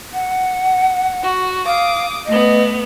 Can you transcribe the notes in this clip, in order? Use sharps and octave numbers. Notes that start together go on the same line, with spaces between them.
F#5
F#4
F5 D6 D#6
A3 B3 D#5